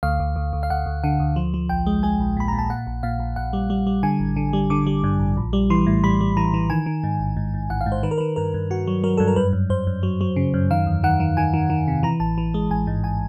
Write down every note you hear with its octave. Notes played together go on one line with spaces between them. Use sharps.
D2 F5
D2
D2
D2
F5
D2 F#5
D2
D3 F#5
D2
F3
F3
A#1 G5
G#3
G#3 G#5
A#1
A#2 B5
A#5
A#2
A5
A#2 F#5
A#1
A#2 F5
A#1
A#1 F#5
G3
G3
G3
D3 G#5
A1
D3
G3
D3 D6
G3
G2
A1
A#1
G3
E3 C6
A2
G3 B5
G3
E3 A#5
E3
D#3 G#5
D#3
G#2
A1
G#2
G#2
A1 F#5
F5
G#2
C5
D#3 B4
A#4
B4
D#3
G2 A#4
G2
G2 F#4
F#3
F#3 A#4
G2 A4
A#4
F#2 B4
F#2
F#2 C5
F#2
F#3
F#3
C#3
F#2
D#3 F5
E2
D#3 F#5
D#3
D#3 G#5
D#3
D#3
C3
E3 A#5
A1 A5
E3
G#3
A1 G#5
G#2
G#5